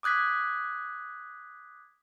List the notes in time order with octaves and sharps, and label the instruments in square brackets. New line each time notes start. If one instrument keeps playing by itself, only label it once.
[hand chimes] D6 D#6 F#6 G#6 B6